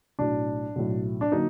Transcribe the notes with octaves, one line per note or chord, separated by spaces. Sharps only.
B1 A2 F#3 D4
B1 A2 F#3
D4
D3 F#3 A#3 D#4